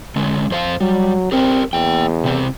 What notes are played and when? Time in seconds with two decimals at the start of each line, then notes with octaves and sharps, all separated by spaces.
0.16 D3 G#3 C#4
0.51 F2 C5 F5
0.81 F#3 G3
1.32 C4 G4 A#4 C5
1.73 E2 A#3 G5
2.24 C3 C4 E4